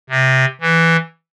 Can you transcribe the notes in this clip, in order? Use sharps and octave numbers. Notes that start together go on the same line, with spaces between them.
C3
E3